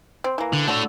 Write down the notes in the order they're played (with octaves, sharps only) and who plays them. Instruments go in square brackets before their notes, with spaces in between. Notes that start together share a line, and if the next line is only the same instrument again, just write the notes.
[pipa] C4
E3 A#3
[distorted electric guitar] D3
[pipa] D3 F#4 A4 [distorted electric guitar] A3 C#5